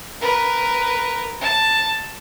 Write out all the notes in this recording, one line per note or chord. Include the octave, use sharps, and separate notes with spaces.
A#4 B4
A5